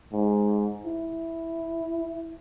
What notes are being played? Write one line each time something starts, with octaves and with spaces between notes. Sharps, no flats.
G#2
E4